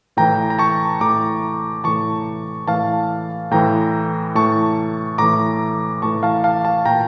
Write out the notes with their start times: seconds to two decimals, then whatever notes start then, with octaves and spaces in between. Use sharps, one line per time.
0.17 A2 E3 G5 A#5
0.50 A#5
0.59 A5 C#6
1.01 A2 E3 A#5 D6
1.84 A2 E3 A5 C#6
2.68 A2 E3 F5 A5
3.51 A2 E3 G5 A#5
4.35 A2 E3 A5 C#6
5.18 A2 E3 A#5 D6
6.02 A2 E3 A5 C#6
6.23 F5 A5
6.44 F5 A5
6.65 F5 A5
6.85 A#2 G5 A#5